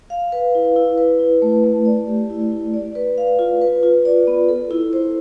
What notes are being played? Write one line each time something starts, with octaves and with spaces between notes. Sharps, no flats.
F5
B4
E4
E4
B4
E4
A3
A3
D5
G4
E4
E4
D5
B4
F5
F4
B4
F4
D5
B3
A4
E4
C5